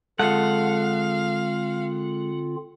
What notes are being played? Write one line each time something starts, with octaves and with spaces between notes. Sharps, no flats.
D3 G#3 C4 F4 A4 F5 F#5